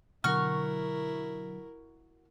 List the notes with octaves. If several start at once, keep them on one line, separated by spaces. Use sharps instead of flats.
B2 D3 F#3 E4 F#4 A#4 C#6 F6